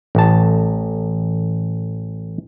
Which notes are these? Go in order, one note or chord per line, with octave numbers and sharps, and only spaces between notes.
A1 A5